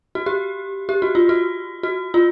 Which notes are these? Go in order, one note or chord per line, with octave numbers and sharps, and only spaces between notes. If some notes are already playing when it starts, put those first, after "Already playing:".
F#4
G4
G4
F#4
F4
F#4
F#4
F4